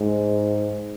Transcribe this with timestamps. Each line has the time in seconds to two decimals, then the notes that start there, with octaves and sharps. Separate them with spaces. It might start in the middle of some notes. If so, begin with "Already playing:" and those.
Already playing: G#2